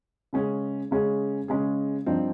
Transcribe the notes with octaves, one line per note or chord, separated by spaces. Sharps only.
C#3 G#3 C#4 G#4
C#3 G#3 C#4 G#4
C#3 G#3 C#4 G#4
G2 F3 C4 D#4